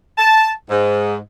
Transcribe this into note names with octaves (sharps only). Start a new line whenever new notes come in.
A5
G#2